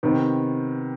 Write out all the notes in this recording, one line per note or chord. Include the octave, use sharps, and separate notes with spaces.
C3 D#3 B3